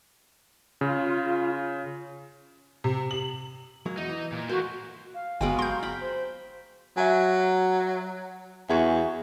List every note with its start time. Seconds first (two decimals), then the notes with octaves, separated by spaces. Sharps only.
0.81 C#3 F4
2.84 C3
3.11 F#7
3.86 F#3 G#3 A#3
3.98 E2 D#4 F#4
4.09 E3
4.32 A#2
4.49 E3 A3 A#3 F#4 C5
5.14 F5
5.41 G1 F#3 G#3 B3 G5 D7
5.59 A#4 C6 G6
5.83 G5 B5
6.00 C5
6.97 F#3 E5 G#5
8.69 E2 F#4 G#4 E5